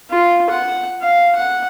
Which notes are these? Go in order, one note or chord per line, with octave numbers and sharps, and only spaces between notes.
F4
F#5
F5
F#5